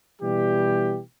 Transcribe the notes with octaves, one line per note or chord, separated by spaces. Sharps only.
B2 E3 G3 G4